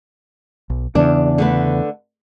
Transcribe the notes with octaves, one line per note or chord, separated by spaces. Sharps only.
B1
E2 C#3 D4
D3 A3 B4